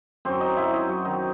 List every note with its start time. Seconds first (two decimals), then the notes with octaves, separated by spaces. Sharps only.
0.25 F#2 F#3 C4 C5
0.40 D#4 D#5
0.57 E4 E5
0.73 D#4 D#5
0.89 F#3 F#4
1.05 D#3 D#4